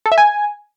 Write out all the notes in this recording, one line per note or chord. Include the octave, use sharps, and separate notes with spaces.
A4
E5
G#5